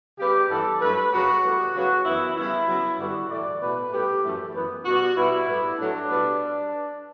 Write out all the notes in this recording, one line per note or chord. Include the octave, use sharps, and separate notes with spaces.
C#3 G3 B3 G4
G2 E3 G3 B3 A4
G2 F#3 A3 B4
F#2 C#3 F#3 B3 F#4
A2 G3 B3
C#3 F#3 B3 F#4
F#2 E3 B3 E4
C#3 G3 B3 E4
C#3 F#3 B3
G2 D3 G3 B3 F#4
A2 E3 A3 D5
B2 A3 B4
A2 G3 B3 G4
F#2 E3 A3
F#2 E3 B3
B2 G3 B3 F#4
B2 G3 B3 E4
A2 G3 B3
A2 F#3 A3 D4
B2 G3 B3